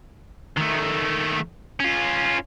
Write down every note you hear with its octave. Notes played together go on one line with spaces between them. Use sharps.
D#3 A3
C#4 F4